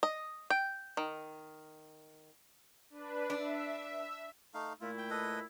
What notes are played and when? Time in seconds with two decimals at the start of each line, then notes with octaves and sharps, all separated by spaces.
0.03 D#5
0.50 G5
0.97 D#3
2.90 D4 B4
3.30 D4 E5
4.54 A3 D#4 F5
4.81 A#2 A3 E4 F4
4.98 G5
5.10 A4 B4 D#5